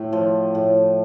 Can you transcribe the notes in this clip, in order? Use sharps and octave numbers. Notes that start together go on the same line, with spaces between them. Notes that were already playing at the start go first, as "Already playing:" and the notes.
Already playing: A2
F3
A2